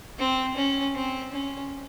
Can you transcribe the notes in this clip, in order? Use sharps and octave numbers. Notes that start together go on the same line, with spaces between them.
C4
C#4
C4
C#4